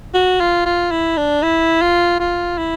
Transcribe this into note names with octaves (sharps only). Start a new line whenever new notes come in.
F#4
F4
F4
E4
D4
E4
F4
F4
E4